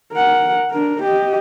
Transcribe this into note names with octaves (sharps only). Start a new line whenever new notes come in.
A#4 F#5
D4 A#4
G4 D#5